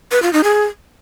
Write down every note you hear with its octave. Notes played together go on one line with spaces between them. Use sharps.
B4
F4
D#4
G#4